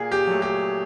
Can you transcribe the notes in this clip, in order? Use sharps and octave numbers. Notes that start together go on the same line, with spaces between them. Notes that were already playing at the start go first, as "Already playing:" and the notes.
Already playing: A#2 G#4
G4
F#3 A3
G4